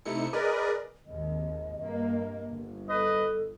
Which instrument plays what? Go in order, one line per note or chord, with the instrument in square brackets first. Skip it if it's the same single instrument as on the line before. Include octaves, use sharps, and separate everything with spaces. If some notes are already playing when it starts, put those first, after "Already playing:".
[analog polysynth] C3 A3 D#4 E4 C#7
G#4 A#4 B4 D5 D#5
[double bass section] G#1 D#2 [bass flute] D#5
[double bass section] G2 A#3
G1
[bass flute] A4 [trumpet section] B4 D#5